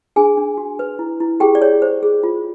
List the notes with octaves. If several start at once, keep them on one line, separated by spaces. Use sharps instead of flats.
D4 G#4 G#5
D4
F#4
B4
E4
E4
G4 G#4 G5
D5
G#4 C#5
C5
G#4
F4